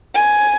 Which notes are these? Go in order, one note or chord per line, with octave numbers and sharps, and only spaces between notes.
G#5